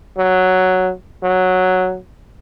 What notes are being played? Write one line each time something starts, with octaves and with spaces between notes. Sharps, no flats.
F#3
F#3